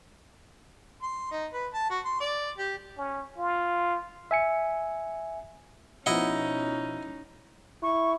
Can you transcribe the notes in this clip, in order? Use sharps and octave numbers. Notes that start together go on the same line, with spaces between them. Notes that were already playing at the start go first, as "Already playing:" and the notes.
C6
D#4
B4
A5
F#4
C6
D5
G4
C#4
F4
E5 G#5 C#7
B2 F3 C#4 D#4 E4 D#5 F#5
E4 C#6